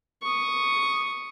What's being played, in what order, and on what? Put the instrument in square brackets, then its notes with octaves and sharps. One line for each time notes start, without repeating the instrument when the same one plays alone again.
[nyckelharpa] C#6 D#6